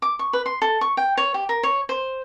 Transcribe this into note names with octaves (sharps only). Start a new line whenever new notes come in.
D6
C#6
B4
C6
A4
C#6
G5
C#5
G4
A#4
C#5
C5